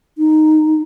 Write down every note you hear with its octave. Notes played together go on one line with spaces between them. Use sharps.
D#4